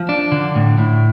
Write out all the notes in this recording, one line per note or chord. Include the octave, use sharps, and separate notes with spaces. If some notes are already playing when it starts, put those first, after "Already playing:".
Already playing: F3
D4
D3
A2
A2